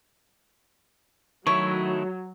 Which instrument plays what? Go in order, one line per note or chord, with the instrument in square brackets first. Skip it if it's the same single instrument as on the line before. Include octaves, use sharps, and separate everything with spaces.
[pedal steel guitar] D#3 A3 E4 [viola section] F#3 [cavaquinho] C#5